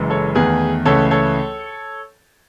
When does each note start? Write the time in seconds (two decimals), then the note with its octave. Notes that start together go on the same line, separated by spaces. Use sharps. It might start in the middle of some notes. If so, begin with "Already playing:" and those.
Already playing: F#1 F#2 E3 G#3
0.10 A4 C#5
0.35 E2 D#3 A3 G#4 B4
0.85 C#2 C#3 E3 A3 A4 C#5
1.11 A4 C#5